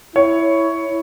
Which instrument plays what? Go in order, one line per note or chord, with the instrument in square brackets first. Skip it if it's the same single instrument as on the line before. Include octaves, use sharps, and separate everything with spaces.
[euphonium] E4 [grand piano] C#5